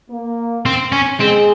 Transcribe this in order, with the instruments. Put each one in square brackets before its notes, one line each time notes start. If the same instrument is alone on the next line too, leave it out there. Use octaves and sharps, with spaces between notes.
[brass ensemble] A#3
[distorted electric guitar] C4
C#4
[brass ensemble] G#3 [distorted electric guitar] C4